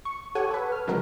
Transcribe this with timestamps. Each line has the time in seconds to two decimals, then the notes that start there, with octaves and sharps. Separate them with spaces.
0.05 C#6
0.35 G4 A4 C#5 F#5 G#5
0.50 A4 B4
0.72 F6
0.87 C#3 F3 F#3 G#3 F#4 A#4